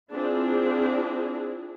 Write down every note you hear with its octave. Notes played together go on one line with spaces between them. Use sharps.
C4 D4 E4 F4 G#4